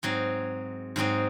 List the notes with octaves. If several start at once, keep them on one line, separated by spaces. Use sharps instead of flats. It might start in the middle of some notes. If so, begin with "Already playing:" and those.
G#2 F#3 C4 D#4
G#2 F#3 C4 D#4